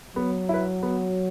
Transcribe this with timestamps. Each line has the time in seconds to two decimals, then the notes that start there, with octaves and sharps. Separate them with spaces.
0.16 F#3 B3
0.49 E4 B4
0.83 B3